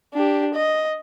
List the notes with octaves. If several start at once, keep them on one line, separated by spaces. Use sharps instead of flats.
D4 G4
D#5